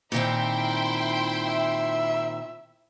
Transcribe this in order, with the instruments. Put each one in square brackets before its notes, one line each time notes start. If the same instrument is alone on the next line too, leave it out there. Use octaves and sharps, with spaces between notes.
[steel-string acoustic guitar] A#2 D#3 C4 [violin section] E4 G5 C6
[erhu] E5